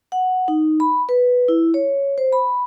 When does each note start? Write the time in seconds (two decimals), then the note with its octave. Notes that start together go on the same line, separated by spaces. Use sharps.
0.12 F#5
0.48 D#4
0.80 B5
1.09 B4
1.48 E4
1.74 C#5
2.18 C5
2.33 B5